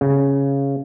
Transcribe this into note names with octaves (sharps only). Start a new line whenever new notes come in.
C#3